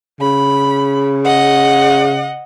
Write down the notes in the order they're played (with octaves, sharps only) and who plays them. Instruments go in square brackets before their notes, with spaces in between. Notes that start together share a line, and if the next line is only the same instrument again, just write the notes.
[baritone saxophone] C#3 [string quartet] B5
[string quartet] D#5 F#5